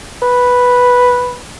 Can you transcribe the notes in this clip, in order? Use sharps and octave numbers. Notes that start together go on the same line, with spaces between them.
B4